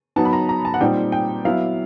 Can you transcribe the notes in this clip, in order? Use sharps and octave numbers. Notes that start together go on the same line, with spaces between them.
F#3 B3 D#4 A5
B5
A#5
A#5
A5
F#5
A#2 G3 C4 D#4 G5
G5
F#3 B3 E4 F5